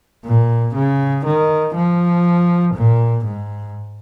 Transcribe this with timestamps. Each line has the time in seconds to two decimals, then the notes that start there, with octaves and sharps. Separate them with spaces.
0.25 A#2
0.75 C#3
1.25 D#3
1.75 F3
2.75 A#2
3.24 G#2